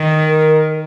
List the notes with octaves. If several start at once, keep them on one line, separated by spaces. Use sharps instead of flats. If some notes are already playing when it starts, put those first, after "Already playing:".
Already playing: D#3
A#4